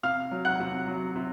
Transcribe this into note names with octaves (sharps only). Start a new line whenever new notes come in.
C3 F5 F6
F#3
F#5 F#6
C3
F#3
C3